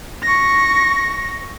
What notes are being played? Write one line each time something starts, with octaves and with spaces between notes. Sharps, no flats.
C#6 A#6